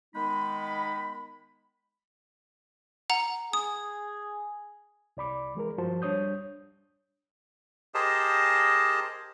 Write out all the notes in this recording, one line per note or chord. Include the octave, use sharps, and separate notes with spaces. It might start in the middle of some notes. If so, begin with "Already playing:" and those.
D#3 G#3 B3 D#4 B5
F#5 A#5
G#4 D#6
C2 D5 B5 D6
E3 G#3 G#4 A#4
G2 F3 F#4 C5 A5
G3 D4 C#5 D#6 G6
G4 G#4 A#4 C5 D#5 A5